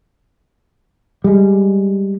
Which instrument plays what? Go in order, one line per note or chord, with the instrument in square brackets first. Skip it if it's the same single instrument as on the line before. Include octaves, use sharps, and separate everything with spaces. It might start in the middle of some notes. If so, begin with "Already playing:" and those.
[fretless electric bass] G3 G#3